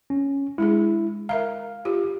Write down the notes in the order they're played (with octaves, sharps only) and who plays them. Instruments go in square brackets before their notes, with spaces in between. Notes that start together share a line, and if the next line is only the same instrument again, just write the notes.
[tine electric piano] C#4
[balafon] G#3 D4 G#4 [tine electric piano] E4
[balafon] A#4 E5 A#5 [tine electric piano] F5
[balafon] F4 G4